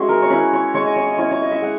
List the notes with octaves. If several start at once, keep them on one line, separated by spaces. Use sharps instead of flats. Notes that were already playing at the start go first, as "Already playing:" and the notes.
Already playing: G#3 C#4 E4 F#4 G#4
A#4
C#5
C#4 E4 B4
C#5
G#3 C#5
D#5
C#5
D#5
C#4 E4 C#5
C#5
D#5
E5
G#3 F#5